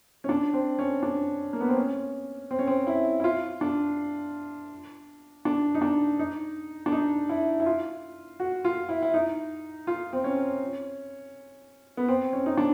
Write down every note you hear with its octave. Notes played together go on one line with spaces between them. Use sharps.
C#4
D4
C4
C#4
D4
A#3
B3
C4
C#4
C4
C#4
C4
E4
E4
F4
D4
D4
D#4
D4
D#4
D4
D#4
E4
E4
F4
F#4
F4
E4
E4
D#4
F4
C4
C#4
B3
C4
C#4
D#4
D4